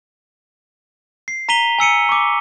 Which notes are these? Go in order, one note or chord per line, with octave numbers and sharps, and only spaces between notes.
C7
A#5 B6 D#7 F7 G7
G#5 E6 C#7 D#7
C#6 D6